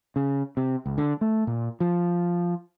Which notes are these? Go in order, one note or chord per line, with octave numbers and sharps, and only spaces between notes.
C#3
C3
C#2
D3
A3
A#2
F3